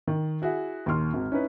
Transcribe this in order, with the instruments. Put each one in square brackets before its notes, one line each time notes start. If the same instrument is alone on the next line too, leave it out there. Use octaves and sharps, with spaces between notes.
[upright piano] D#3
E4 F#4 G#4 E5
D#2 A#2 D#3 C6 F6
G#1 F#4
C#4 D#4 E4 B4